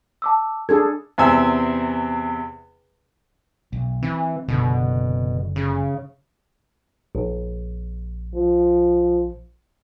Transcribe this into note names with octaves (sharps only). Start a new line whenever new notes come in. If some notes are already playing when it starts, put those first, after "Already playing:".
A5 D6 E6
D4 G#4 A4 G#6
E2 C3 G#5 E6
B1
E3 C4
F#1 B2 D3
C#3
A#1
F3